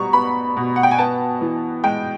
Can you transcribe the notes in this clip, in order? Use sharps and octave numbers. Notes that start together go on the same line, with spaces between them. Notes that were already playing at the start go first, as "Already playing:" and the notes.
Already playing: B2 G3 A#5 C#6
B3 B5
B2
F#5
G5
G#5
B3 A5
E3
G#3 G5